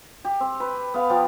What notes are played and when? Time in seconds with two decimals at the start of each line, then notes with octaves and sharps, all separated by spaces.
0.25 G4
0.40 C4
0.60 B4
0.94 B3 F5
1.10 F3 G4